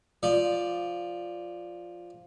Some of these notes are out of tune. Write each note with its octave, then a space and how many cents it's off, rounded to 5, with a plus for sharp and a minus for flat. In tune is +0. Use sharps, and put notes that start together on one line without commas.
F3 +0 D5 +0